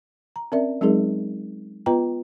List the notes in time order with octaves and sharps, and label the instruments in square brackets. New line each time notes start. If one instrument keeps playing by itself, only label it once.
[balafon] A#5
C4 C#4 A#4 D5 E5
F#3 G#3 C4 D#4 G#4 A#4
B3 F4 B4 D#5 G5 A#5